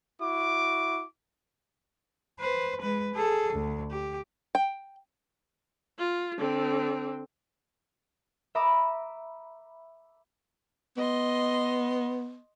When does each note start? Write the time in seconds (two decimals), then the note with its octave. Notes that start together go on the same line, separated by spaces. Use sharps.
0.21 E4 F#4 D6
2.40 B4 C5
2.82 G#3 B4
3.14 G#4 A4
3.53 D2
3.91 G4
4.55 G5
5.98 F4
6.38 D3 C4
8.55 E5 A#5 B5 D6 D#6
10.97 B3 D#5 C6